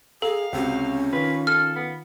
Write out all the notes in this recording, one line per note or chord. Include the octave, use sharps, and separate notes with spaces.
G#4 A4 F5 A#5
C#2 C3 C#4 F#4
D#3 F4 B4
A4 F6
B3